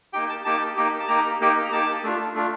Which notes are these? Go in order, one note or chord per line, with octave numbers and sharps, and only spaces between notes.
A#3 D#4 G4 G5
A5
A#3 D#4 G4 A5
A#3 D#4 G4
A5
A#3 D#4 G4 A#5
A#3 D#4 G4
A#5
A#3 D#4 G4 A5
A3 D4 F4
A3 D4 F4